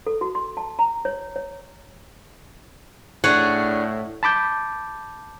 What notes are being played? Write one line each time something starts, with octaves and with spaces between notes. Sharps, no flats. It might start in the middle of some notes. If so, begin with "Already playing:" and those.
A4
F#4
C6
A5
A#5
C#5
C#5
A2 D4 G#4 C#5 F#5
A5 B5 D6 G6